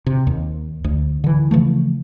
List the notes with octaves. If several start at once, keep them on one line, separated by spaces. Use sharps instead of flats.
C3
D#2
D2
D3 E3
C#3 E3 F3 A3